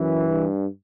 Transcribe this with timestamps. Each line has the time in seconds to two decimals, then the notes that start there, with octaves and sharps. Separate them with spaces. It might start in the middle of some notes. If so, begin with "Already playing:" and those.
Already playing: F#2 E3
0.29 G2